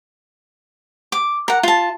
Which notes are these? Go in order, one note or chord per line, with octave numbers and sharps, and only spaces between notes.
D6
A#4 F#5
F4 A5